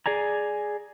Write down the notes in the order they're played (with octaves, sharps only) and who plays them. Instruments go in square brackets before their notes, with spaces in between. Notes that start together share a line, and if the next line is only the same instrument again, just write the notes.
[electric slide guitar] G#4 D5 G#5 A#5